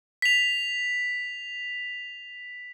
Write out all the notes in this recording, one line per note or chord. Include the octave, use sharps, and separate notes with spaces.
B6 F7